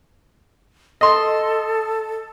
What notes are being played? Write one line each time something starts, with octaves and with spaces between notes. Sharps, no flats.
A4 D#5 C6